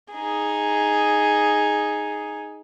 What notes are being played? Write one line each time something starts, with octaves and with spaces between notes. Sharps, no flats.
D#4 G#4